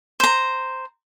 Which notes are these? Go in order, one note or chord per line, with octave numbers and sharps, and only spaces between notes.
C5 A#5